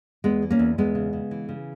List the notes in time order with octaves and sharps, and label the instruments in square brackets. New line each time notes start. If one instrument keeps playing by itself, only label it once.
[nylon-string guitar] E2 G#3 B3
E3
A#3 C#4
E2
E2 G#3 B3
C#3
C#3
E3
C#3